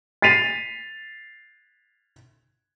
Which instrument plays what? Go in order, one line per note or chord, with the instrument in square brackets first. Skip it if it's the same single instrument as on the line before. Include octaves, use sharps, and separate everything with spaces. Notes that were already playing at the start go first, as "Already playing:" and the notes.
[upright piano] A6 B6 C7 D#7 F7